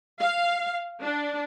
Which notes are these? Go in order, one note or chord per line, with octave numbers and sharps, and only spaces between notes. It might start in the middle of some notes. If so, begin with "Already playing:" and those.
F5
D4